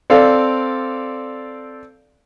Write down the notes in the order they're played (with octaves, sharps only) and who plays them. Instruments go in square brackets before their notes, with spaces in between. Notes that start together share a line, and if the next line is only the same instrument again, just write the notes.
[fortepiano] C4 A4 D5 F5